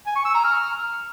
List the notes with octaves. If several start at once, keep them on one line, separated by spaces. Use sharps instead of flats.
G#5
C#6
E6
A#5
F6